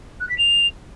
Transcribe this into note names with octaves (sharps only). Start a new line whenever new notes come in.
F#6
B6
F7